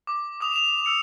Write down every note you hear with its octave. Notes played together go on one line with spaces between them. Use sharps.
D6
D6 D#6 F7
E7 F7
E6 C#7 F7